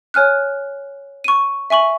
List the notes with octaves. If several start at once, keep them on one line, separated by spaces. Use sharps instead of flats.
C#5 G#5 F6 F#6
C#6 D#7
E5 G#5 C#6 F#7